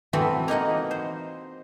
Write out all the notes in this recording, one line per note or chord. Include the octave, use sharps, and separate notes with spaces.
E3 B3 C4 F#4 A4 B5
A#3 D#4 D#5 F#5
C5